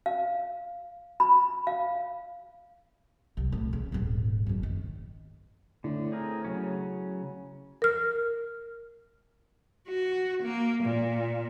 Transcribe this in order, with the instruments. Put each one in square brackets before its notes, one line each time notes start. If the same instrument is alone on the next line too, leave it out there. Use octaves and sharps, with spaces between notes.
[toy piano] F5
B5
F5
[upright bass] C2
A2
C#3
D#1 G#2
F#1 D#3
D#3
[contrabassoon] A2 [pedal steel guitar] D3
[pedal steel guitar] C4 G#4 A#4
C#3 F#3 C#4
[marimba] A#4 F6
[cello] F#4
A#3
A#2